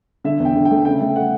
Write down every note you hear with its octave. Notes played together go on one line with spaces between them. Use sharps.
D3 E5
E2
G5
D3
G5
A3
C#3 G5
A3
F#5